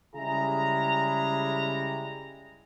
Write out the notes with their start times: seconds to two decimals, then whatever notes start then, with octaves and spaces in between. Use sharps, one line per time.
0.15 C#3 G3 G#3 E4 G#4 A#5